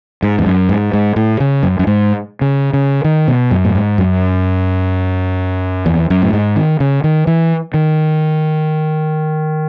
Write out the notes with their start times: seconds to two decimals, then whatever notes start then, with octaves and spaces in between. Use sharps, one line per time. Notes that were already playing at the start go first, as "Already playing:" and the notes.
0.23 G#2
0.39 E2
0.46 F#2
0.69 G#2
0.93 G#2
1.16 A2
1.40 C#3
1.63 F#2
1.79 F#2
1.87 G#2
2.41 C#3
2.73 C#3
3.04 D#3
3.28 B2
3.51 F#2
3.65 A2
3.75 G#2
3.98 F#2
5.86 E2
6.10 F#2
6.22 A2
6.33 G#2
6.56 D#3
6.80 C#3
7.04 D#3
7.27 E3
7.74 D#3